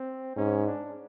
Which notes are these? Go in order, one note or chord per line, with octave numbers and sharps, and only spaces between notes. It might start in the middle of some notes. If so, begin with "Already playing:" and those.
Already playing: C4
G#2 C#4
D4